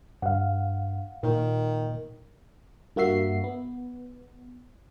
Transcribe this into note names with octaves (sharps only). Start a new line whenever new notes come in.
G2 F5 F#5
A#2 D#3
G2 A#3 F#4 E5 C7
B3